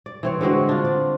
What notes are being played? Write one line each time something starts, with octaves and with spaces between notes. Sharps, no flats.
D5
E3 C4 C#5
D3 G#3 C4 F#4
D4 F4
D5